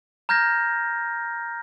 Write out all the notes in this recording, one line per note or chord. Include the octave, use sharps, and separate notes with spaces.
A#5 F6 G6 G#6 A#6